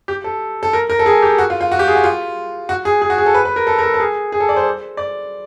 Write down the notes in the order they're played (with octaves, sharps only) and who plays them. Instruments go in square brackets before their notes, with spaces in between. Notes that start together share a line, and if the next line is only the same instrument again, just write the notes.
[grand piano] G4
A4
A4
A#4
A#4
A4
G#4
G4
F#4
F4
F4
F#4
G4
G#4
F#4
F4
F#4
G#4
G#4
F#4
G#4
A4
B4
B4
A#4
A4
A#4
A4
A4
G#4
G#4
A4
D5
C5
D5